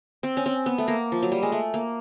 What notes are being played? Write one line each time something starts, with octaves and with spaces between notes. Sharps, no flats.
C4
C#4
C4
B3
A3
A#3
F3
F#3
G3
G#3
A3
A#3